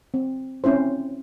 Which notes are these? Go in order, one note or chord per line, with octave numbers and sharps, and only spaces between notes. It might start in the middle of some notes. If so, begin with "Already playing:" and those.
C4
C4 C#4 E4 C5